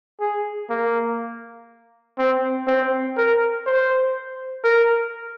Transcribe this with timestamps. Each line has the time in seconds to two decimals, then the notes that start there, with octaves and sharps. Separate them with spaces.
0.21 G#4
0.70 A#3
2.19 C4
2.67 C4
3.17 A#4
3.66 C5
4.64 A#4